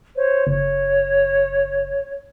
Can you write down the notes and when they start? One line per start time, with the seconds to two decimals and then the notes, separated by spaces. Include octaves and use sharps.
0.15 C5 C#5
0.47 F#1 C#5